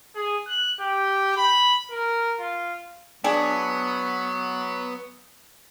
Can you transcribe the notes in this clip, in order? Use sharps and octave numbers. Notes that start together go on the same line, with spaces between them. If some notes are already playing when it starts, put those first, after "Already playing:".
G#4
F#6
G4
B5
A#4
F4
F#3 B3 D4 G#4